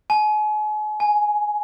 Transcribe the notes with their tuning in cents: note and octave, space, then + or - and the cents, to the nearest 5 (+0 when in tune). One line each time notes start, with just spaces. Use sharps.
G#5 +40
G#5 +10